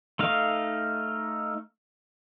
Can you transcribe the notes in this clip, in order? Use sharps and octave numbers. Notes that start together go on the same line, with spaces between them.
A3 D#4 F5